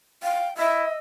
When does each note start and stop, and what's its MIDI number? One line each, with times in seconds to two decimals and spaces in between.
0.23 0.46 77
0.23 0.52 79
0.57 0.84 64
0.57 0.98 75
0.57 0.90 76
0.57 0.98 88